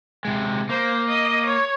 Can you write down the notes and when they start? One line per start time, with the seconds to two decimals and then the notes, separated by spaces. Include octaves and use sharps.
0.25 C3 G#3
0.69 A#3 C5
1.07 D#5
1.46 C#5